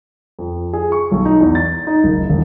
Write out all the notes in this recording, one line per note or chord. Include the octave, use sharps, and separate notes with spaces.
F2
G#4
C#6
B1
D#4
E2
A6
D#4
F#1
E1